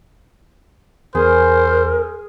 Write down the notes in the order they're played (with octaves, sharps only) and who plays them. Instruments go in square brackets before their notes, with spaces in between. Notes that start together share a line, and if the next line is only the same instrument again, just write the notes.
[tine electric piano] E2 [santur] G#4 [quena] A#4 [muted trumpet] C5